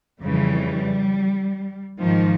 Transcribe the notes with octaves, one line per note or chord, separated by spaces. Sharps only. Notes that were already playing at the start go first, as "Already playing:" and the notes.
F2 C#3 E3 G3
G#2 D#3 F3